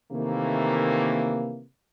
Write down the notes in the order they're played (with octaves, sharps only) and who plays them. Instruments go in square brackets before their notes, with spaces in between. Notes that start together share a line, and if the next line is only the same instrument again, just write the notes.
[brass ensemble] C3 D#3 E3 A3 A#3